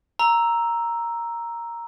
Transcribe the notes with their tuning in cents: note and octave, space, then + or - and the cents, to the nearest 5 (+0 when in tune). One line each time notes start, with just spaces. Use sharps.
A#5 +0 E6 +0